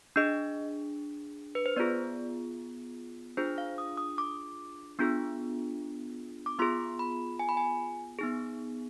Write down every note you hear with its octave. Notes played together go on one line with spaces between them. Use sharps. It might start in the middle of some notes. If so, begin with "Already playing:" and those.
D4 G#4 D#5
B4
C5
B3 F4 G#4 D5
D4 F4 G#4 C5
F5
D#6
D#6
D6
B3 D4 F4 G#4
D6
B3 F4 G#4 C6
B5
G#5
B5
G#5
B3 D#4 G#4